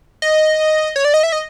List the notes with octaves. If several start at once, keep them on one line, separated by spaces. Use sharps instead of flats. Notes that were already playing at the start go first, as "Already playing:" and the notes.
D#5
C#5
D5
D#5
E5
D#5